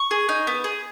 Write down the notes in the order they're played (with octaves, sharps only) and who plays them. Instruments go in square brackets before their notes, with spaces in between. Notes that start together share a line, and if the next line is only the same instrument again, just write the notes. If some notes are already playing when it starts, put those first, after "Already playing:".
Already playing: [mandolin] C#6
G#4
D#4
B3
G#4